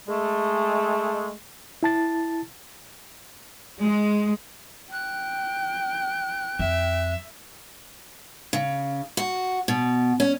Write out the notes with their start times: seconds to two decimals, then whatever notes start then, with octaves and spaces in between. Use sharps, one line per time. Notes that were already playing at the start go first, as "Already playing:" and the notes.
0.08 G#3 A3
1.83 E4 A5 A6
3.82 G#3
4.92 G5 F#6
6.59 F2 E5
8.53 C#3
9.17 F#4
9.68 B2
10.20 C#4